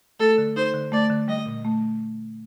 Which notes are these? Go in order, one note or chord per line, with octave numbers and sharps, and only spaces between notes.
A3 A4
D3
D#4 C5
D3
A3 D5
D3
G3 D#5
A#2
A3